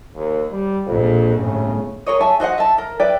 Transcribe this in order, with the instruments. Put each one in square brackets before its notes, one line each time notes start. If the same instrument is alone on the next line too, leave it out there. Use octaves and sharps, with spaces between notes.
[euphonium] D#2
G3
[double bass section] A#1 [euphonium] F2
[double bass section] G1 A2 [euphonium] C#3
[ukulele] G#4 A#4 C#5 D#5
E5 G#5 A5
F#4 C5 D#5 F#5
E5 A5
A#4
B4 D5 E5 G5